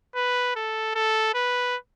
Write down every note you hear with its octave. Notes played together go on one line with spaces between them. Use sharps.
B4
A4
A4
B4